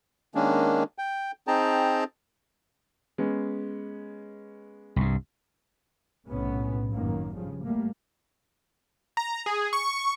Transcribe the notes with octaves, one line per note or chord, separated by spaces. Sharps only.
D#3 G#3 A#3 C#4 D4
G5
C4 D#4 G#4 G5 A5 A#5
G#3 B3 C#4
C2 G2
B1 A2 C3 B3 C#4
G#1 F#2 D#3 A#3
G2 C#3 F3
G3 A3 A#3
A#5
G#4
C#6